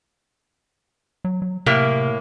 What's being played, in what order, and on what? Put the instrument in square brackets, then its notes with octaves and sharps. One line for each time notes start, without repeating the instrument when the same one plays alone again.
[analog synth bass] F#3
F#3
[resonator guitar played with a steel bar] A2 A#3 [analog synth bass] C3